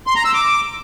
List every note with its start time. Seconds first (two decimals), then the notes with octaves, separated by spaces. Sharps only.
0.07 C6
0.16 A#5
0.25 E6
0.34 D6